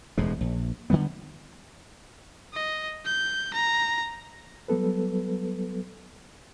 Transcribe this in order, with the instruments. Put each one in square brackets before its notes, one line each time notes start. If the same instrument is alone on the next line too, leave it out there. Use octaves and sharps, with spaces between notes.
[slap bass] E1 D#2 A2 G#3
A#1
D3 D#3 G3 B3
[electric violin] D#5
G6
A#5
[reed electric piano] F#3 G3 B3 A4 B4